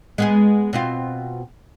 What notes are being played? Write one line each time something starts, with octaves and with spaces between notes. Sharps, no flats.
G#3 B3 G#4
B2 C4 F4